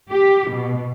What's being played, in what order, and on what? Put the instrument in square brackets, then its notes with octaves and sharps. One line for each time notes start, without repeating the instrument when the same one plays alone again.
[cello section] G4
B2